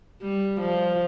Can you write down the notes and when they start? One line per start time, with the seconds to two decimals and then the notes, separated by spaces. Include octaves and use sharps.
0.22 G3
0.61 F3